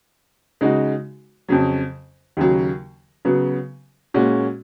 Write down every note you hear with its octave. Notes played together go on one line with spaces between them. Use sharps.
C#3 G#3 D#4 F#4
F2 C#3 F#3
D#2 C#3 F#3
C#3 F#3 B3
A#2 G#3 C#4 F#4